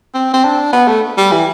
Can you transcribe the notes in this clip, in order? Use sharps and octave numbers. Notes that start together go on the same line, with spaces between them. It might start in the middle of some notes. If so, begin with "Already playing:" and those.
C4
C4
D4
B3
A3
G3
E3